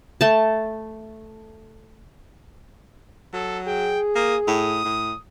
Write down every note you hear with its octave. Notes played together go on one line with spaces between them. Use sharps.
A3 A5
F#3 A4
G#4 G5
A#3 D#6
A2 D#6
A2